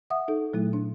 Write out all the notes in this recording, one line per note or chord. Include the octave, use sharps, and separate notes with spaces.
E5 F#5 D#6
D#4 A4
A#2 F#3 A3 E4
D4